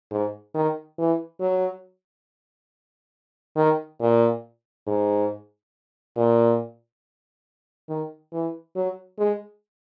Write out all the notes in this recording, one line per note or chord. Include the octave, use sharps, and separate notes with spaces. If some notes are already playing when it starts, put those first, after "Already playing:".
G#2
D#3
E3
F#3
D#3
A#2
G#2
A#2
D#3
E3
F#3
G#3